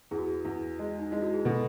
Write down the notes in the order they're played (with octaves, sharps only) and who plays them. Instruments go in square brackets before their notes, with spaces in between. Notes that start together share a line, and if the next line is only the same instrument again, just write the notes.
[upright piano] E2 [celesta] G#4
[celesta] F#4
G#4
[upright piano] E2
G#3
[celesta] D#4
[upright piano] G#3 [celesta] E4
[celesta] F#4
G#4
[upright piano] B2 [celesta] A4